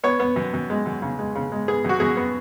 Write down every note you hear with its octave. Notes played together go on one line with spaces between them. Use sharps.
B3 C#5
B3
F#2
F#2
G#3
F#2
C#3
G#3
C#3
G#3
B3 G#4
F#2 F#4
F#2 G#4
B3